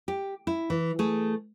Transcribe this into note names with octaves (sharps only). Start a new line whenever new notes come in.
G4
E4
E3
A3 G#4 A4